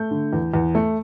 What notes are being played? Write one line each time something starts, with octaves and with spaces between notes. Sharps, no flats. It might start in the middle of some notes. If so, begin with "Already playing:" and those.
Already playing: A3 G6
D3
E2
E2
A3